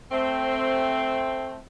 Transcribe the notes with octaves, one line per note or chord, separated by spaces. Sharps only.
A3 C4